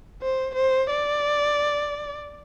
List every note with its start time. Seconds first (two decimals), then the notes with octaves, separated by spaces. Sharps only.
0.22 C5
0.55 C5
0.90 D5